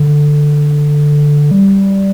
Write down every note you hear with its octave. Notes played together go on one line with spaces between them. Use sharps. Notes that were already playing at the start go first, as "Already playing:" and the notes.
Already playing: D3
G3